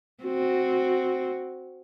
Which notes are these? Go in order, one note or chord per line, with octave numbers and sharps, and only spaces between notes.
C4 F#4